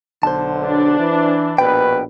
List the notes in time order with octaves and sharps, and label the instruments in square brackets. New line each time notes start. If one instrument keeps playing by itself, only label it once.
[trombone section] B1 D3 [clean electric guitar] C5 A5
[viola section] D4
[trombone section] E3
[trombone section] A#1 B2 B4 [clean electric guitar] G5